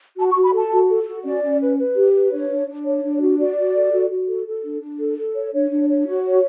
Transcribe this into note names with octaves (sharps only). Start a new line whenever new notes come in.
F#4 A5
C#6
F#4
B5
A4 A5
F#4
A4
F#4
C#4 D5
C#4
B4
B4
G4
B4
D4 C#5
D4
D4
C#5
D4
F#4
F#4 D5
F#4
A4
F#4
F#4
A4
A4
D4
D4
A4
A4
C#5
D4 C#5
D4
C#5
F#4
C#5